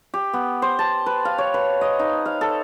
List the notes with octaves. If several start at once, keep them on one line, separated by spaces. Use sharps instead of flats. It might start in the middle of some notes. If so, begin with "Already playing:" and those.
G4
B3
C5
A5
B4
F5
C#5
B4
D#5
D#4
F5
A4